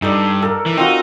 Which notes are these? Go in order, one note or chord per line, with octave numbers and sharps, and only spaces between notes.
G2 D#4 A4 D5
A4 A#4
E3
C4 D#4 F4 F#4